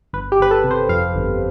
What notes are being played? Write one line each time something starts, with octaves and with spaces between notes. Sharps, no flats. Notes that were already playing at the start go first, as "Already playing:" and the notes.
G1 B4
G4
G1 B4
A4
C3
C5
F2 F5
G1